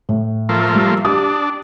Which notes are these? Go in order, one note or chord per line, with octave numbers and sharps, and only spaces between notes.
A2
F3 A3 A#3
G3
D4 G4 D#6